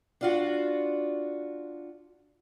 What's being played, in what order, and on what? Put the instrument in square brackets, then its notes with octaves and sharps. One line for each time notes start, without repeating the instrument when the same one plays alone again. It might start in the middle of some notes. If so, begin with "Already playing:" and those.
[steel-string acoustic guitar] D4 F4 F#4